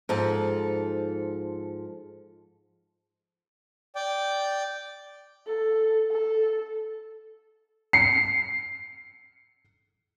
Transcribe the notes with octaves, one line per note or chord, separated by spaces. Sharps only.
G#2 F3 A4
D5 G5
A4
A4
C7 C#7